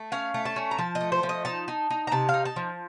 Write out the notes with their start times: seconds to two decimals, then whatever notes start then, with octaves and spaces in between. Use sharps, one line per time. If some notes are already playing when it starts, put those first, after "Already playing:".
Already playing: A3
0.12 C#4 F5
0.34 A3
0.45 A5
0.56 C#4
0.71 A#5
0.78 F3 A5
0.95 D#5
1.01 A3
1.12 C5
1.23 F3
1.29 D#5
1.45 D#4 A5
1.68 D#4
1.90 D#4
2.07 A#5
2.12 C3 A5
2.29 F5
2.34 D#4
2.45 A5
2.56 F3